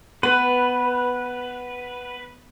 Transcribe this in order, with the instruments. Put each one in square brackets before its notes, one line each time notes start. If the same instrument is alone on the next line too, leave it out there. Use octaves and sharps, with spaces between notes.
[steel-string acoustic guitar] B3 [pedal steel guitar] B4